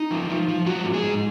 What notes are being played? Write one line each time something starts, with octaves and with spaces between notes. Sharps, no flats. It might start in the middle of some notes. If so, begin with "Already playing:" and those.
Already playing: D#4
F3
F3
F3
F3 F#4
G#2
G#4
G#2